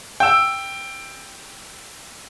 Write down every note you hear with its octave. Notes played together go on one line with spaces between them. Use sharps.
G5 E6